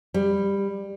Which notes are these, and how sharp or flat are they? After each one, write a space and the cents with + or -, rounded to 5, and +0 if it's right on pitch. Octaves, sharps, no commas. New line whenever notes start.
G3 +15